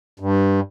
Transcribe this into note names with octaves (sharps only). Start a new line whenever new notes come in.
G2